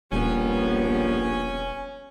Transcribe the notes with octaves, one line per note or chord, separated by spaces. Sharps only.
E1 A#1 G3 B3 C#4